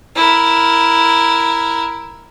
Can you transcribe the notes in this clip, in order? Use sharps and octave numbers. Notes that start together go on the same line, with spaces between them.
E4 A#4